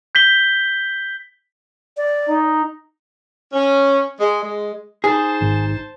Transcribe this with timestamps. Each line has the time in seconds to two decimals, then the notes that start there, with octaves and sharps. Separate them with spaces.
0.15 G6 B6 G7
1.97 D5
2.29 D#4
3.52 C#4
4.19 G#3
4.41 G#3
5.04 D#4 G#4 C5 A5
5.41 G#1